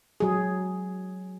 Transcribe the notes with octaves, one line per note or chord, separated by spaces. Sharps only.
F#3 G#4